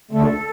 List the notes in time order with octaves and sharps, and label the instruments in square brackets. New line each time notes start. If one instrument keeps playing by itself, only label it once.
[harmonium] D2 D3 A3 [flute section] A4